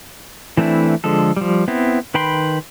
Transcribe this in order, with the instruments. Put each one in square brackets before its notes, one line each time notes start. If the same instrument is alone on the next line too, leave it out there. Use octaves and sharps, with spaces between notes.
[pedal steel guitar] E3 A3 C4 D4 E4
D3 F3 G#3 A4
F3 G3
B3 C4 E4
D#3 B4 G5 B5 C6